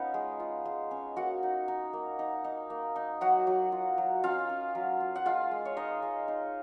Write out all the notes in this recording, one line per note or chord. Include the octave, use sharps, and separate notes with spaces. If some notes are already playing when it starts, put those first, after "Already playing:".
Already playing: B3 C#4 D#4 F4 B4 C#5
G#3
F4
G#3
C#4
A#3 F#4 F#5
D#4
D#4
A#3
D#4
D#4
A#3
D#4
F#3 F#4 F#5
F#3
F4
F#3
C#4 F4 F5
C#4
F#3
F4
F#5
G#3 F4 F5
G#3
C#5
G#3 D#4 D#5
G#3
D#4